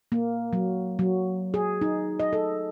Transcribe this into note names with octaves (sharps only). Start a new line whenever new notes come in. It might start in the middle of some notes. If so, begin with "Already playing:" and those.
A#3
F#3
F#3
G#4
D#4
D#5
A4